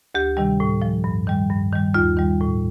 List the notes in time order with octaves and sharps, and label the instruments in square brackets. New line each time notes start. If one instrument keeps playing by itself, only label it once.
[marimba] D2 G4
C3 D#3 G3
A2
F3
G2
D#3 G3
G2
D#3 G3
D#2 F4
D#3 G3
A2